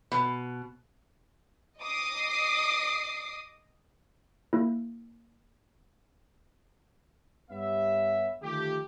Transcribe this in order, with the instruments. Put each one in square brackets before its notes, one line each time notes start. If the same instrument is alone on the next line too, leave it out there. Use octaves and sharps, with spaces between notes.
[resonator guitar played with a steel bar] B2
[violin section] D#5 D6 D#6 C7
[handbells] A#3 E4
[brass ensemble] G2 G3 B3 C#5 E5
D3 D#3 F3 A3 G4